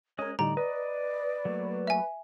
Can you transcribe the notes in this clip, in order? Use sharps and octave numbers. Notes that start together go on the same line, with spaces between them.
G#3 C#4 A#4 C#5 D#5
A2 D3 G3 D#4 D5 A#5
B4 D5 D#5
F#3 A3 A#3
E5 G#5